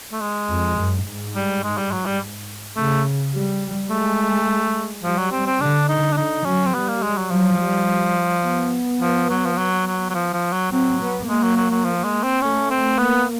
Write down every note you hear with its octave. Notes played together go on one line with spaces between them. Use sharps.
A3
G#3
F2
F#2
G#2
G3
G#3
G3
F#3
G3
C#3 A3
G3
G#3 A3
F3 G3
F#3
C4
C4
D3 D4
D#4
D4
D3 D#4
F#3 C#4
C4
G3 B3
A#3
G#3
F#3
F3 F#3
G3
B3
F3
F#3
F3
F#3
F#3
F#3
F3
F3
F#3
F#3 C4
B3
G#3 A#3
F#3
F#3
F#3
F3
G#3
C4
A3 C#4
C4
A#3 B3